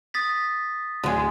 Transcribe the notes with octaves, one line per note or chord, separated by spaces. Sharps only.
D#6 A6 B6
D1 D3 G#3 G#5